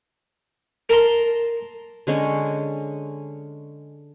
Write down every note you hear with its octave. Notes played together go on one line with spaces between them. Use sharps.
A#4 A5 A#5 C6
D3 G#3 C#4 C#6